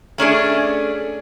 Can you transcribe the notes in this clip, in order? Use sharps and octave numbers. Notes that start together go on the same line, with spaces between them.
A3 C#4 D4 G#4